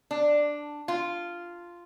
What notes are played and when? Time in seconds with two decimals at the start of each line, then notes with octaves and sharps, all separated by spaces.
0.11 D4
0.88 F4